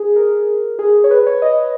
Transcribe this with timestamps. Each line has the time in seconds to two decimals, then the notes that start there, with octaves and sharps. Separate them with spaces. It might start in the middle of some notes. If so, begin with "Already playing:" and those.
Already playing: G#4
0.16 A#4
0.79 G#4
1.04 C#5
1.11 B4
1.26 C#5
1.42 D#5